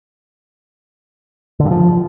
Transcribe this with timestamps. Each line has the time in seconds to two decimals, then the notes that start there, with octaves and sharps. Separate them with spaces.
1.60 D3
1.65 G2
1.71 F3